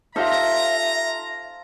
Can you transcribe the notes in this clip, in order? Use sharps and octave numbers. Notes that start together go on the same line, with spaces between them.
D#4 F4 G4 A4 C5 E5 F5 A#5